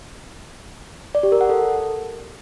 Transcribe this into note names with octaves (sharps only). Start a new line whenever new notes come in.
D5
G4
A#4
F#5
A4